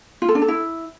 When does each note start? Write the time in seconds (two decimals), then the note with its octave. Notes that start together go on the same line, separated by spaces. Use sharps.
0.22 F4
0.28 A4
0.35 D4
0.42 A4
0.48 E4